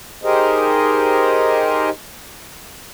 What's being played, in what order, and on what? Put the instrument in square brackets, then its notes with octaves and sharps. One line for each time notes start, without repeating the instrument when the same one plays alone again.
[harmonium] D#4 G4 G#4 A#4 C5 D#5